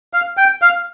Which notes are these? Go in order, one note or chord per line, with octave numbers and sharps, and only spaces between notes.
F5
G5
F5